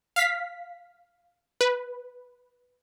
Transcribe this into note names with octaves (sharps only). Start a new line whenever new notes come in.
F5 B6
B4